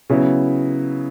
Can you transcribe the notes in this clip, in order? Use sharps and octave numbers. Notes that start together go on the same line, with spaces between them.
C#3 F#3 B3 E4